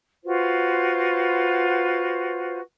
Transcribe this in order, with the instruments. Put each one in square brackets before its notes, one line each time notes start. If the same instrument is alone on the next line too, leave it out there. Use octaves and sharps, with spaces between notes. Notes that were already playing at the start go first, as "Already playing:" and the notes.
[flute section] F4 F#4 B4 C5